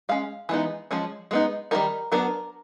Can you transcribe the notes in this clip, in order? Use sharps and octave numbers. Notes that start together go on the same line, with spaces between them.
G#3 C#4 F5
E3 G#3 B3 D#4
F3 G#3 C#4
G#3 B3 D#4
D#3 G3 C4 D#4 A#4
F#3 B3 D4 A#4